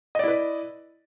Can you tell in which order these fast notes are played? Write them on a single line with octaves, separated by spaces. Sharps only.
D#5 D5 E4 B4